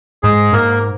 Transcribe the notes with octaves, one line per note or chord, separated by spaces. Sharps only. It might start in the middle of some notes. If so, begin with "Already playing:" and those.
G#2 G#3 G#4
G#2 A#3 A#4